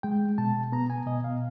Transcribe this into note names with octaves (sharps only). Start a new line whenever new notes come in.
G#3 G5
B2 A5
B3 A#5
G#5
B2 D#5
F5